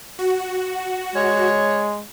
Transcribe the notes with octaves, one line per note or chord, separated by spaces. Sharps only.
F#4
G#3 C#5